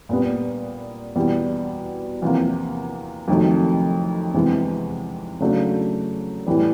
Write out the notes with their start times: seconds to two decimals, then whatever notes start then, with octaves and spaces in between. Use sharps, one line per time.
0.09 A#2 G3 B3
1.16 E2 B2 G3
2.22 E2 C3 F3 A#3
3.28 F2 C3 D#3 F#3 A3
4.34 E2 C3 E3 G#3
5.40 C#3 F#3 A3 D4
6.47 A2 E3 G3